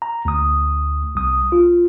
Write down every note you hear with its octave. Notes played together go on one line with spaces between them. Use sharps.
A#5
D2 D#6
C2 D#6
F4